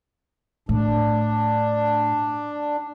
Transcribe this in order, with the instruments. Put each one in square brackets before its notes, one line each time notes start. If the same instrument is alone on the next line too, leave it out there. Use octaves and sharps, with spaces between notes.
[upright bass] A2 [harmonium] D4